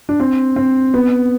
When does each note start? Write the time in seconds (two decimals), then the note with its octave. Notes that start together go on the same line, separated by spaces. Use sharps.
0.09 D4
0.20 C4
0.56 C4
0.94 B3